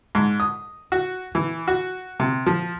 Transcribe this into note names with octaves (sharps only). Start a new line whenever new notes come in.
G#2
D#6
F#4
E3
F#4
C3
F3